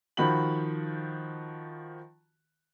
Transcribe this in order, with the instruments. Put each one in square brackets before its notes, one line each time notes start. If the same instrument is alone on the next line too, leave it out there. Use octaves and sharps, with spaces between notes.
[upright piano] D#3 F3 F#4 B5 F#7